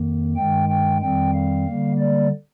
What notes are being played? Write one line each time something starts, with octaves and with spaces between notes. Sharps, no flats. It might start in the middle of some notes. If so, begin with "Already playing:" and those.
Already playing: F2 D#3 A#3
G2 D#3 G#3 G5
G5
F2 D#3 G3 C4 G5
F5
D3 G3 A#3
D5